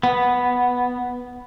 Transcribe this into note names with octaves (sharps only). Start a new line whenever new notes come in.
B3